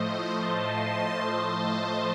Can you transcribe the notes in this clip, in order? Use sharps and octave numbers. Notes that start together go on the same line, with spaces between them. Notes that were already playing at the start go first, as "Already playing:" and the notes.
Already playing: A2 F3 A3 C5 D#5
A5 C6
C5 D#5